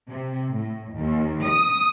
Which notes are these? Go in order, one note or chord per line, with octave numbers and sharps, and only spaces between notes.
C3
A2
D#2
D#6